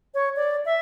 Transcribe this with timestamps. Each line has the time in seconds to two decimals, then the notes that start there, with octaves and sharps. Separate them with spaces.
0.14 C#5
0.36 D5
0.65 E5